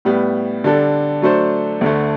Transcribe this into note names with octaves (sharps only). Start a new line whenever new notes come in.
A2 G3 B3
D3 G3 D4 A4
F#3 A3 D4 A4 C5
D2 D3 A3